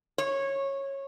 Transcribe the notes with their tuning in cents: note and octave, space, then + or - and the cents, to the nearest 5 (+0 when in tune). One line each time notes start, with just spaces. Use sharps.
C#5 -15